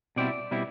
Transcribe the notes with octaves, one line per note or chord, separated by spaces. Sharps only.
B2 G3 C4 E4 D5
B2 G3 C4 E4